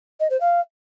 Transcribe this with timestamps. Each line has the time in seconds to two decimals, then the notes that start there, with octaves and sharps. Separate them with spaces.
0.20 D#5
0.30 C5
0.40 F5